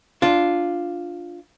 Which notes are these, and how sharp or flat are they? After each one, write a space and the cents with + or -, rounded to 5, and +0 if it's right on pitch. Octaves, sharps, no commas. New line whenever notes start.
D4 +0 F4 +0